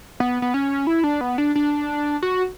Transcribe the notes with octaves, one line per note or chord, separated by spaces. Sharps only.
B3
B3
C#4
E4
D4
B3
D4
D4
F#4